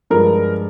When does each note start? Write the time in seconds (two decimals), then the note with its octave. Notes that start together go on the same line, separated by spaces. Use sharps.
0.10 G2 F3 G#3 A#4